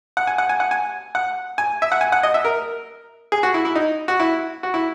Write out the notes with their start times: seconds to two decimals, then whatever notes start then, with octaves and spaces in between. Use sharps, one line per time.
0.17 F#5
0.27 G#5
0.38 F#5
0.49 G#5
0.60 F#5
0.71 G#5
1.15 F#5
1.58 G#5
1.82 E5
1.92 F#5
2.01 G#5
2.12 F#5
2.23 D#5
2.34 E5
2.45 A#4
3.32 G#4
3.43 F#4
3.54 E4
3.65 E4
3.76 D#4
4.08 F#4
4.20 E4
4.63 F#4
4.74 E4